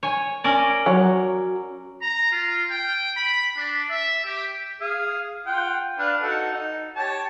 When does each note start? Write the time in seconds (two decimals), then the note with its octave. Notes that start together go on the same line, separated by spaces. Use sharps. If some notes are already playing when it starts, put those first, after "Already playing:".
0.03 C#5 G#5
0.44 C#4 A#4 D5
0.86 F#3
2.01 A#5
2.31 F4
2.69 G5
3.17 B5
3.56 D4
3.89 E5
4.24 G4
4.81 G#4 F5
5.46 F4 F#5 G5
5.99 D4 B4 F5
6.23 D#4 F#4 A4
6.53 D#4
6.96 G4 C#5 A5